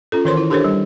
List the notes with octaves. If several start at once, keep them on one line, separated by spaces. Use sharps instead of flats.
C#4 F4 A4
D#3 E3 A#4 C5 C#5 C6
E4
D4 G4 A4 A#4 C5 C#5
G3